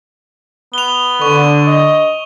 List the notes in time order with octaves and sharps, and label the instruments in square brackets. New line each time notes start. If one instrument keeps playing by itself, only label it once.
[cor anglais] B3 [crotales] F7 G7
[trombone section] D3 [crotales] C#6
[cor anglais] D#5